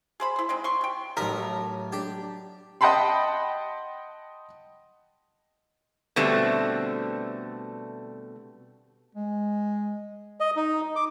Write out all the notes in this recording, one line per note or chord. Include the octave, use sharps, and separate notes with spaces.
G#4 C5 B5
E4 C5
G#3 C4 D#4
C6 C#6
C3 G5
A1 F#3 A3 D#4 A#4 B5
D4 G4
D#5 F#5 G5 A5 B5 C6
B2 D3 G3 A3 C4
G#3
D#5
D#4
D6